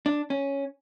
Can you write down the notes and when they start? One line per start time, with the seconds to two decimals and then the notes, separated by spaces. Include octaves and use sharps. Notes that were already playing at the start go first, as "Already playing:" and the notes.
0.06 D4
0.30 C#4